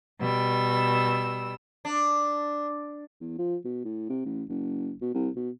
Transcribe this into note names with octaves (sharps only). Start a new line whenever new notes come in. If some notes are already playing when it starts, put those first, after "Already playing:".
B2 G3 E6
D4
E2
F3
B2
A2
C3
A1
F#1
B2
C2
B2